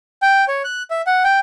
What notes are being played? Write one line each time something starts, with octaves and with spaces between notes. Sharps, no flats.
G5
C#5
F#6
E5
F#5
G5